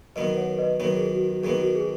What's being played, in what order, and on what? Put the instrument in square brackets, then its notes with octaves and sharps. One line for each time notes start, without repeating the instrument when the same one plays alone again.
[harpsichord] F#2 D#3 B3 [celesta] B4 D#5
[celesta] C#5 F#5
B4 D#5
[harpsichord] F#2 D#3 B3 [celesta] C#5
[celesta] G#4
F#4
F#4
[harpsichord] F#2 D#3 B3 [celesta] G#4
[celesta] F#4
G#4